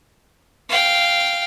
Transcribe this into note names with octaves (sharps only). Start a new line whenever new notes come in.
F5 G5